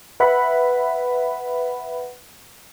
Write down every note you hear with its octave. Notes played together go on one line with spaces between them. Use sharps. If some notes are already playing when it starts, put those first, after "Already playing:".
B4 E5 F#5 B5